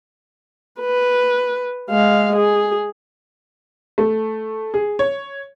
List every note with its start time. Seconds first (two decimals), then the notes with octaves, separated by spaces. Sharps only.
0.81 B4
1.90 G#3 F5
2.36 G#4
3.98 A3
4.74 G#4
4.99 C#5